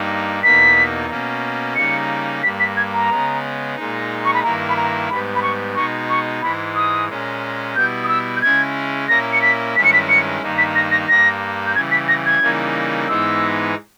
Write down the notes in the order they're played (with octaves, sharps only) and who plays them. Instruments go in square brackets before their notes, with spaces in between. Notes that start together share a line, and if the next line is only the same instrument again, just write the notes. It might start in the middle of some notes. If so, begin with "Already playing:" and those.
Already playing: [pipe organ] G2 G3 A#3 D#4
[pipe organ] E2 B2 A#3 D#4 [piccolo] B6
[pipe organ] B2 A#3 C#4
[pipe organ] C#3 G3 A#3 D#4 [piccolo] C#7
[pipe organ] G2 G3 A#3 [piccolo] B6
[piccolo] B6
G#6
A#5
[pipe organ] C#3 G#3 B3
A#2 G#3 D#4
[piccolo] C#6
B5
[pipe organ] G2 D#3 A#3 E4 [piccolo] A#5
[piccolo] B5
A#5
[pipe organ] G#2 G3 B3 [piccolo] B5
[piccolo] B5
C#6
[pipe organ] B2 G#3 D#4 [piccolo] C#6
[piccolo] C#6
[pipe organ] G#2 E3 G#3 [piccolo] B5
[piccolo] D#6
[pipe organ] A#2 G#3 C#4
[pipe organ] B2 G3 B3 E4 [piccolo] G6
[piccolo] D#6
E6
G6
[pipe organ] C#3 G#3 C#4 E4 [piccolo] G#6
[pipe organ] A#2 A#3 C#4 E4 [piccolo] A#6
[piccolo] C#7
B6
[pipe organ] G2 D#3 G#3 C#4 E4 [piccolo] B6
[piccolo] C#7
B6
C#7
[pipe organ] G2 D#3 A#3 D#4
[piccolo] B6
A#6
A#6
[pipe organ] G2 G3 A#3 [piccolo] A#6
[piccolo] G6
[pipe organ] C#3 E3 G3 [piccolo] G#6
[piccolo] B6
A#6
G#6
[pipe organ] C#3 E3 G3 A#3 D#4
[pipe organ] G#2 E3 G#3 B3 D#4 [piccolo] E6